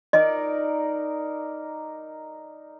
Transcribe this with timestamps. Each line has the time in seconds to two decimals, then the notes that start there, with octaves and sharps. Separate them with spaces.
0.13 D#4 A#4 D5 D#5